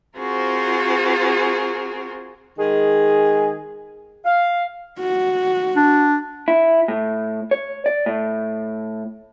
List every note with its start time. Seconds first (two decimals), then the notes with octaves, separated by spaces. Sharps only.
0.18 C4 F4 F#4 G#4 A#4 C5
2.58 D#3 G#3 G#4
4.25 F5
4.99 F#4
5.76 D4
6.48 E4
6.88 A2
7.51 C#5
7.86 D5
8.06 A2